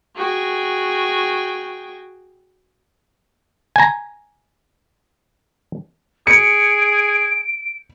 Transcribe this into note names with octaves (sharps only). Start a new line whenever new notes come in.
F#4 G#4 G5
G#5 A#5
G#4 C#7 D7